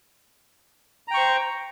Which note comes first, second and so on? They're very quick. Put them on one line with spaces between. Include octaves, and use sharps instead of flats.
A#5 G5 C#6 C5